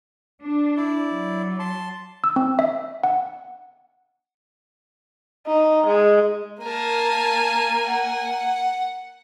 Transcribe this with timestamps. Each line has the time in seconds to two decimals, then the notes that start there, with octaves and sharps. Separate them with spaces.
0.42 D4
0.77 E4 D5
1.09 F#3
1.60 A5 C6
2.24 E6
2.36 C4
2.59 E5
3.04 F#5
5.47 D#4
5.86 G#3
6.63 A#3 A#4 G#5 A5
7.85 F#5